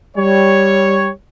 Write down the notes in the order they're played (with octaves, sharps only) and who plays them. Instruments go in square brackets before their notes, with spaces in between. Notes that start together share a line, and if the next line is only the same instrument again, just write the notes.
[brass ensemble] G3 C#5